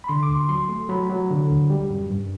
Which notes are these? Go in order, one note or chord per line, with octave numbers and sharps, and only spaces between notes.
B5
D3 C6
D6
D2
C6
F#3 C6
A3
F#3 B5
F#3
D3
D2
G3
F#2
G2